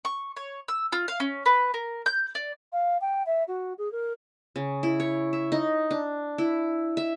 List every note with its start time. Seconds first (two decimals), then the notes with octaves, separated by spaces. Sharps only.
0.05 C#6
0.37 C#5
0.68 E6
0.92 F4
1.08 F5
1.20 C#4
1.46 B4
1.74 A#4
2.06 G6
2.35 D5
2.73 F5
3.01 G5
3.26 E5
3.48 F#4
3.78 G#4
3.92 A#4
4.56 C#3
4.83 E4
5.00 C#5
5.33 E5
5.52 D#4
5.91 D4
6.38 E4
6.97 E5